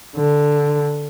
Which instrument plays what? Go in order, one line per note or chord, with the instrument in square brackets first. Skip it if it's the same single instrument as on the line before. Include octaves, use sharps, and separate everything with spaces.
[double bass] D3